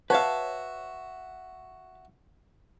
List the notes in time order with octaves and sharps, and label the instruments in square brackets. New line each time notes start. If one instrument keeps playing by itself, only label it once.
[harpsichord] F#4 E5 [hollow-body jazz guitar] B4 C#5 F5 [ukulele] A5